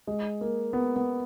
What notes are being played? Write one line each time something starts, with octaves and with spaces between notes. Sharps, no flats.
G#3
A#3
B3
B3